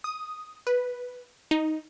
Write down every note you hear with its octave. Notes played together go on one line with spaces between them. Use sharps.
D#6
B4
D#4